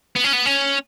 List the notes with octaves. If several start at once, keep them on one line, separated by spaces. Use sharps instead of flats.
B3
C#4
B3
C#4